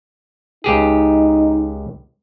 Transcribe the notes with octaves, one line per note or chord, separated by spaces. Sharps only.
C#2 D#4 G4 G#4